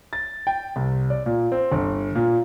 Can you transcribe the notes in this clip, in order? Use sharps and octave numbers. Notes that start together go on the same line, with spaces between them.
A6
G5
C2
D5
A#2
C4
G1
A#2